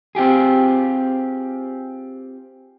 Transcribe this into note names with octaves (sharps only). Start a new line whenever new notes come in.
C4 F4 G4 G#4